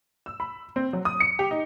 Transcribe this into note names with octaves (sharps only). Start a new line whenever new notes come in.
E6
B5
C4
F#3
D#6
C#7
G4
D#4